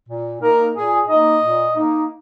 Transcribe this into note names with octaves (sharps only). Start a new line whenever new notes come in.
A#2
A#3 D#4 A#4
A#2 G#4
A#3 D#4 D#5
A#2
A#3 D#4